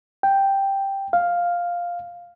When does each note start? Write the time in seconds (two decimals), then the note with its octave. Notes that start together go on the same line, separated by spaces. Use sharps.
0.23 G5
1.13 F5